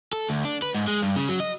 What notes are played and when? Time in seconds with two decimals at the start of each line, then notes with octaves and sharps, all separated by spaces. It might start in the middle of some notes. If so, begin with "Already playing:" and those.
0.13 A4
0.29 D2
0.45 D4
0.62 B4
0.75 G#2
0.88 G#3
1.02 G2
1.16 C#3
1.29 F#3
1.40 D#5